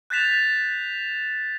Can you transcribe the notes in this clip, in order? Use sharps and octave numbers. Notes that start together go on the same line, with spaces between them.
F#6 G6 A6 B6 E7 F7